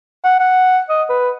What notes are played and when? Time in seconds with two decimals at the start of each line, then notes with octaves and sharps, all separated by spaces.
0.25 F#5
0.40 F#5
0.89 D#5
1.09 B4